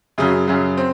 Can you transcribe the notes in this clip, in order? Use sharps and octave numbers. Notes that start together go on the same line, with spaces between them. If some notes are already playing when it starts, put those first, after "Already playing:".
F#2 C#3 F#3 G#4
F#2 C#3 F#3
C4